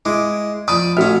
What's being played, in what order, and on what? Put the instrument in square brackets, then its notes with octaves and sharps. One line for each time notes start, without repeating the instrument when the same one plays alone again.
[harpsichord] G#3 [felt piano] E4 [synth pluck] D6
[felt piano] F3 D#6 [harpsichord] D5 B5
[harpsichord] A1 C#4 [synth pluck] F#4 F6 [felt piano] E5